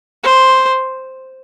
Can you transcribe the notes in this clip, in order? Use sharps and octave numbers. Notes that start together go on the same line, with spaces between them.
C5